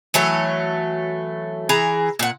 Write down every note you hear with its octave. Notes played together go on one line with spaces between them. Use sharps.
E3 F#3 A3 C#5
E3 G#4 A#5
A#2 F#5